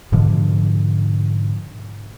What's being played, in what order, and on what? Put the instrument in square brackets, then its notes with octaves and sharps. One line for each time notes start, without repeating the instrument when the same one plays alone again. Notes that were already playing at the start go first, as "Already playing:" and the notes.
[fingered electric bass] G#2 B2 D3 F3